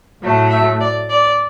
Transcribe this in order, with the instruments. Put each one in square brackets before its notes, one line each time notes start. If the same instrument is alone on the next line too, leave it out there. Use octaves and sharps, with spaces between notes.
[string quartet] A2 F#3 A3
E5
D5
D5